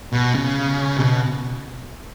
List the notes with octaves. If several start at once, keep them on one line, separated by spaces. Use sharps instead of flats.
B2
C#3
B2